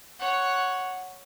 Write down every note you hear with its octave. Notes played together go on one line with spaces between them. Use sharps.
C#5 F#5